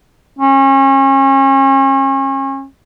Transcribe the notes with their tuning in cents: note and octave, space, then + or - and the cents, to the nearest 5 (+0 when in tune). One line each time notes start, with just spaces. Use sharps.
C#4 -35